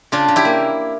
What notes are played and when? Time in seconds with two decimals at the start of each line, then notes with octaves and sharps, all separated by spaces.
0.12 C#3 D4 F4
0.28 C#3
0.36 E4 G4
0.45 A#3